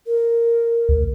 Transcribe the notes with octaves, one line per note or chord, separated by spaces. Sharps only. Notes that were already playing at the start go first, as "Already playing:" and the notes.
A#4
D2